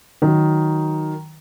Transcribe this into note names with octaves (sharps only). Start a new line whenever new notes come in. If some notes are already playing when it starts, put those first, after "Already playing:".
D#3 F#3